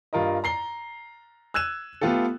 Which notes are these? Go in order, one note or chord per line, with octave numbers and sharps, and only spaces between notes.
G2 F4 A#4 D#5
A#5 C7 G7
E6 F#6 G#6 D#7 E7
A3 B3 F4 G4 A4